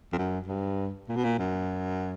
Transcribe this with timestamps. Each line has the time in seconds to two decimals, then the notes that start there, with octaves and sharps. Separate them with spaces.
0.13 F2
0.18 F#2
0.48 G2
1.09 A#2
1.16 B2
1.24 A#2
1.38 F#2